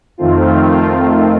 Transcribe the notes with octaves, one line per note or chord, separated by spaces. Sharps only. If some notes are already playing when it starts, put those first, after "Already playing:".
F2 D#3 A3 C4 F4